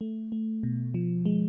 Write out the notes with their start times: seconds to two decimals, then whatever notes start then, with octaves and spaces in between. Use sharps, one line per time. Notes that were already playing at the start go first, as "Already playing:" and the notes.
0.01 A3
0.32 A3
0.63 B2
0.94 F3
1.25 G#3